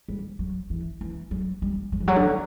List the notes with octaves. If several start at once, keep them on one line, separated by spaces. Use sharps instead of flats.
G3
F#3
E3
E3
F#3
G3
F#3
E3
F#3
D3